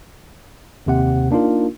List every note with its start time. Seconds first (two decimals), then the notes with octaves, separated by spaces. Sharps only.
0.86 D#2 C3 F#5
1.31 A#3 D4 D#4 F4 A#4